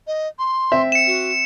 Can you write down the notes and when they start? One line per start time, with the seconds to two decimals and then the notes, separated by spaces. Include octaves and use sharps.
0.07 D#5
0.39 C6
0.72 C4 E5
0.92 C#7 E7
1.07 F#4